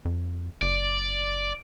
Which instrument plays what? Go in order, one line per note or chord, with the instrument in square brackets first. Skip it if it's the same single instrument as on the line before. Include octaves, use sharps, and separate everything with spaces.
[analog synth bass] F2
[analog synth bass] F#1 [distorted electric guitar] D5